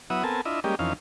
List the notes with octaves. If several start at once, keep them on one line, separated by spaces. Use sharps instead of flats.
F#3 B3 E4 E5 F#5 D#6
B3 C4 A4 A#4 G#5 A5
D4 E4 F4 D#5 E5
G3 G#3 A#3 C#4 G4 D#5
F2 E3 C#4 D#4 F5